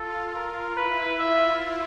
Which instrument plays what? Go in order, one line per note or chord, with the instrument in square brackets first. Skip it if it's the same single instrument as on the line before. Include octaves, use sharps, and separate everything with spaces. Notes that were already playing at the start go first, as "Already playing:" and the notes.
Already playing: [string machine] F4 [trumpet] A4
[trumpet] A#4
[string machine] E4 [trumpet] B4
[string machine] F4 [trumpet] E5